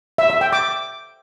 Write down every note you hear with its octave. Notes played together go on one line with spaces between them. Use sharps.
E5
E5
G5
D6